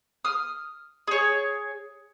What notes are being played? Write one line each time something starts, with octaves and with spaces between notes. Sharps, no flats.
D#6 F6
G#4 C#5